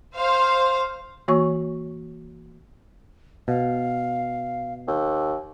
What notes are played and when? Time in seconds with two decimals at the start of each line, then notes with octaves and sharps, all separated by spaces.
0.16 C5 F5
1.28 E3 A#3 F#4 C#5 C#6
3.48 B2 F5
4.87 D#2